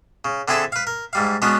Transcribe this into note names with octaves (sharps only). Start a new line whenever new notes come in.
C#3
D3 C4 E4 G#4 A4 A5
B4 F5
A#4
G#2 G3 F5
G#3 B3 C#4 D4 F#4